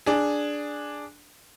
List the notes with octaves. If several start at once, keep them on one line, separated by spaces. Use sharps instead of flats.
D4 G#4